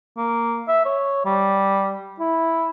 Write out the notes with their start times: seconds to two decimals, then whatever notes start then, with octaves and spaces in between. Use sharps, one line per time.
0.17 A#3
0.68 E5
0.86 C#5
1.25 G3
2.20 E4